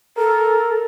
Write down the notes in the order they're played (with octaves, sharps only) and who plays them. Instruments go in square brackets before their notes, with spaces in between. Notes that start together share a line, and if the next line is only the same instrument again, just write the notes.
[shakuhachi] A4 [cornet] A#4